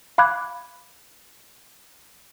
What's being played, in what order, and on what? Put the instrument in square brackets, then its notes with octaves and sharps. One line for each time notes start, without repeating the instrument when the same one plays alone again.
[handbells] F5 B5 D6 F#6 G#6